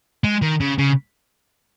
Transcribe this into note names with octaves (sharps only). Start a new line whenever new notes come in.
G#3
D#3
C#3
C#3